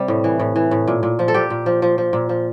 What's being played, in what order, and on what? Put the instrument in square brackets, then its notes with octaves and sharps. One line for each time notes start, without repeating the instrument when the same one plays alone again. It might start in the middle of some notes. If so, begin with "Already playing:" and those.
Already playing: [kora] C3 G3
A2
E3
A2
E3
A2
A#2
A#2
F3
A4
A#2 G4
A#2
F3
F3
F3
A#2
F3